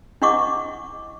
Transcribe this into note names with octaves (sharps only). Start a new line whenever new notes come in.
D4 E4 D#5 F#5 C#6 D6